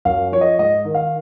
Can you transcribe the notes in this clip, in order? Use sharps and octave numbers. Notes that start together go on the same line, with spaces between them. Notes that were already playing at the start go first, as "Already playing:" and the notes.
F#2 F5
F3 C#5
D#5
G#2 D#5
D#3
F5